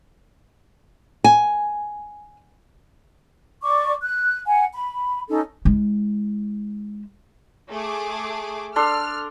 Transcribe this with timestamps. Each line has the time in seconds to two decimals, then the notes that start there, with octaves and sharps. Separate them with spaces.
1.24 G#5
3.63 D5 C#6 D6
4.03 F#6
4.46 F#5 G#5
4.74 B5
5.29 C#4 D#4 A4
5.65 G#3 E4
7.71 A3 G#4 D6
8.76 D4 A4 C6 F6